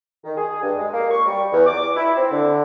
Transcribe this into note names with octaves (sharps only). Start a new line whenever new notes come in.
D#3
G#4
G2
G#3
A#3
C#6
G3
E2
D6
E4
C4
D3